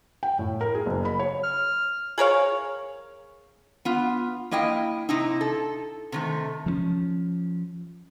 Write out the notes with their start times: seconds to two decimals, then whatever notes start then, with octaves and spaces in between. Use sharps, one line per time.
0.23 G5
0.39 A2
0.61 A#4
0.75 G#4
0.86 F#1
1.05 B5
1.19 C#5
1.44 F6
2.18 G#4 A#4 C#5 F5
3.85 B3 F4
4.51 A#3 E4 D#5 F5 G5
5.09 C3 D#4 E4
5.41 A4
6.12 C3 D#3 A3
6.66 F3 C4 C#4